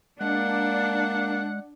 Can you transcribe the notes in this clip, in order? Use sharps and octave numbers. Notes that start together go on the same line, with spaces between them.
G#3 A#3 D4 F#5